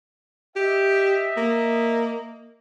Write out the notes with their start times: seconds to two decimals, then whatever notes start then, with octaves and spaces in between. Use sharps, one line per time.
0.56 G4 D#5 E5
1.37 A#3